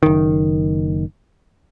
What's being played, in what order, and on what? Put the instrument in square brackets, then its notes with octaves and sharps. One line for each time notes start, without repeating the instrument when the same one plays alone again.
[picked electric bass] F#1 D#3